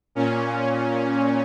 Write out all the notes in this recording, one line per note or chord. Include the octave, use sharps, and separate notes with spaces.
A#2 C#4